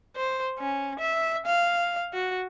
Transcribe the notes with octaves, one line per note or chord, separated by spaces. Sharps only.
C5
C#4
E5
F5
F#4